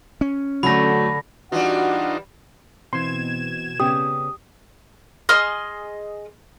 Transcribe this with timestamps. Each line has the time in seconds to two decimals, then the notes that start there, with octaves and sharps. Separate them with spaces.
0.21 C#4
0.63 D3 F#3 A3 B5 A#6
1.52 E3 G3 D4 D#4 F4 F#4 F#5
2.93 B2 E3 C4 C6 G#6 E7
3.80 C#3 B3 C#4 G4 D#6
5.29 G#4 D#5 C6 F6